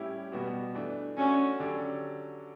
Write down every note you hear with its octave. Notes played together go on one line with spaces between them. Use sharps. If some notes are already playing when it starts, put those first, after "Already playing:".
Already playing: A2 G3 C#4 E4 G4
B2 G3 B3 F#4
E3 A3 D4
A3 C#4 D4 F#4 C#5
D3 F#3 C#4 G4 D5